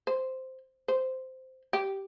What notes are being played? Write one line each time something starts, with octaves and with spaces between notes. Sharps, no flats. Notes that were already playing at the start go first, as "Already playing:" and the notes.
C5
C5
G4